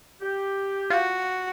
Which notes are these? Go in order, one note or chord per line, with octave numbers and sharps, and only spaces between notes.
G4
F4 F#4